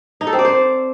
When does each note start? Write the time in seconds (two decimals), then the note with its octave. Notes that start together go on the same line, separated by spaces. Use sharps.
0.21 D#4
0.27 A4
0.33 C4
0.39 D5
0.45 C5